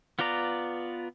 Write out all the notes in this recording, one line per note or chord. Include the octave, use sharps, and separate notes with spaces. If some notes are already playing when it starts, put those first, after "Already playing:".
B3 F4 B4 D5 A#5